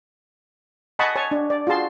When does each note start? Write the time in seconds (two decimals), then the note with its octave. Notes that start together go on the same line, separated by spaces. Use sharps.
0.99 D#5 F#5 G#5 A5 B5 C#6
1.16 C#5 G#5 A5 C#6
1.31 D4
1.50 D5
1.67 F4 F#4 G#4 A5 C6